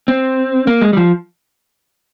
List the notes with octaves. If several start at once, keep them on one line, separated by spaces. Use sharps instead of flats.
C4
A#3
G#3
G3
F3